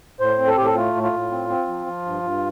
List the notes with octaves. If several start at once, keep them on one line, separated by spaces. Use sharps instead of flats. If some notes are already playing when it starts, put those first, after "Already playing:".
A2 C5
C4
A4
A2 G4
A4
A3 F4
A2
F4
A2
C4
C4
F3
F3
G2
G2